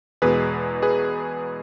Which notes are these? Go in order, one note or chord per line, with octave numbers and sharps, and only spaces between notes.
E2 B2 G#3 G#4 B4
G#4 B4